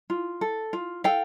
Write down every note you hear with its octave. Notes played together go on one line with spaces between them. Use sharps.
F4
A4
F4
A4 F5 G5